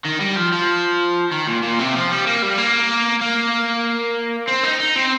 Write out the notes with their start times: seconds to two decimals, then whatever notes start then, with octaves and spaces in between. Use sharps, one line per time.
0.05 D#3
0.21 G3
0.37 F3
0.53 F3
1.32 D#3
1.47 A#2
1.63 A#2
1.79 C3
1.95 F3
2.11 G3
2.27 A#3
2.42 G3
2.58 A#3
3.22 A#3
4.48 C4
4.64 D#4
4.80 D#4
4.96 C4